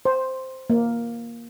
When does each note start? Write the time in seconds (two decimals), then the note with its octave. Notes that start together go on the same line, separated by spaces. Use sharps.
0.05 C5
0.70 A#3